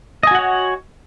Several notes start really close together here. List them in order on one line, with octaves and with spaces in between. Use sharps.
D#5 G#5 F#4 F#5 C#5